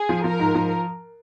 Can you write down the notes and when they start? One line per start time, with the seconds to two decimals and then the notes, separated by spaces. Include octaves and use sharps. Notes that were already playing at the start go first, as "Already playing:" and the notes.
Already playing: G#4
0.09 F3
0.24 F3 A#4
0.39 G#2
0.55 F3